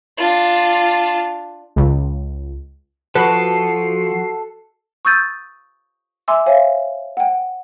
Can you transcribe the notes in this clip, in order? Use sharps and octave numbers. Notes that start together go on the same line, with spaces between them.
D4 F4
C#2
F3 F#4 A4 B4 F#6 C7
C#6 D#6 E6 G6 A6 D#7
E5 G#5 C6 D6 E6
C5 C#5 E5 F5 G#5
F#5 G5